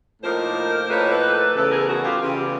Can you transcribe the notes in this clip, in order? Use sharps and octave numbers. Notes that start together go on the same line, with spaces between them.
A2 F3 A#3 D#4 A#4 C5
A2 F3 A#3 D#4 B4 C#5
A4 B4
A4 B4
E2 C#3 E3 A3 A4 B4
G#4 A#4
F#4 G#4
F4 G4
E2 C#3 E3 A3 F4 G4